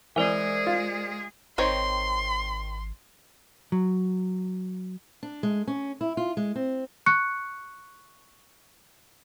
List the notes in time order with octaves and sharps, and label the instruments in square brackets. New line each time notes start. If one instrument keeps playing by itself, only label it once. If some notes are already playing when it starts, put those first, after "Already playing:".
[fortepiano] E3 [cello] G#3 G#4 [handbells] A#4 C5 D5
[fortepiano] F4
[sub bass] G#1 [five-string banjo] D#3 C4 C#5 [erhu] C6
[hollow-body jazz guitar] F#3
[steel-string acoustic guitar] D4
G#3
C#4
E4
F4
G#3
C4
[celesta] C#6 F#6 C#7